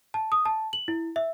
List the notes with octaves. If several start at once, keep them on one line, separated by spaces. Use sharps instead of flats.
A5
D#6
A5
F#7
E4
E5